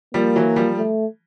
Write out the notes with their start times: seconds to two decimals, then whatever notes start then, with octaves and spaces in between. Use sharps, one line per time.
0.14 F3 G3 A#3
0.36 E3 F#3
0.56 F3 G3
0.77 A3